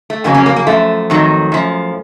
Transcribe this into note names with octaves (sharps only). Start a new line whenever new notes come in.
A3
F2 C#3 F#3 A#3
A#3 C#4
A#3
A#3
F#2 F3 A3
F2 D#3 F#3
F#2 F3